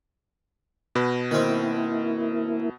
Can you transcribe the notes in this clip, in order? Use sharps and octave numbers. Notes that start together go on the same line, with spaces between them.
B2 B4
D#3 A#3 C4 E4